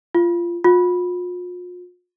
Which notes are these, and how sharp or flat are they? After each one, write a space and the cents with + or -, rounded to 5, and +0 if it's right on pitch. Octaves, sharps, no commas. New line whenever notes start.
F4 -20
F4 +40